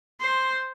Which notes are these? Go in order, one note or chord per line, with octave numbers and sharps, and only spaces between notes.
C5